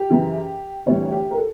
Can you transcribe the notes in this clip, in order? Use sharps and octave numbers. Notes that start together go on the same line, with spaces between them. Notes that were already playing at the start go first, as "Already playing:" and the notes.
Already playing: G4
F#2 C#3 E3
D2 C3 E3 G3 C#5
G4
A#4
A4